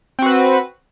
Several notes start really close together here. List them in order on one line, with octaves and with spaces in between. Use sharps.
C4 F#4 B4